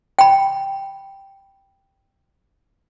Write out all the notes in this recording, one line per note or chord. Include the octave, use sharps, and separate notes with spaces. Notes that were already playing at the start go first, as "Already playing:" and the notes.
G5 B5